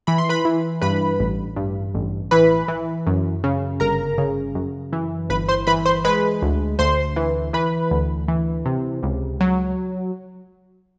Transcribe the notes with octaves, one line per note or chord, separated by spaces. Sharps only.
E3 B5
C6
B4 B5
E3
G2 B4 B5
A1
G2
A1
E3 B4 B5
E3
F#2
C#3
G1 A#4 A#5
C#3
F#2
E3
G1 B4 B5
C5 C6
E3 B4 B5
C5 C6
G#3 B4 B5
D2
D2 C5 C6
E3
E3 B4 B5
D2
E3
C3
C#2
F#3